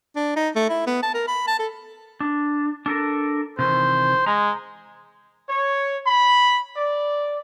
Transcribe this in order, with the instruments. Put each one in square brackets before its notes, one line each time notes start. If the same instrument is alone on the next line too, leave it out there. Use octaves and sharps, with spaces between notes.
[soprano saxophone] D4
D#4
A3
E4
B3
A5
A#4
B5
A5
A4
[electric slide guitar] D4
D4 A4 A#4
[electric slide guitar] C3 D#3 E3 [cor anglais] C5
[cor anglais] G#3 [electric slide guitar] A#5
[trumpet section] C#5
B5
D5